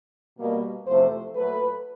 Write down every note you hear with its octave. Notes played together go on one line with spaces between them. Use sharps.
B2 G3 A#3
E2 C3 F3 A3 C5
A#2 F#3 A3 B4